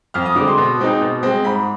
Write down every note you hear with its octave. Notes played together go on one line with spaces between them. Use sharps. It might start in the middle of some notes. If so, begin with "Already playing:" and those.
F2 F6
D#6
D3 G#3 C4 D6
C6
B2
G#3 C4 D#4
B2
G#3 C4
G#2 B5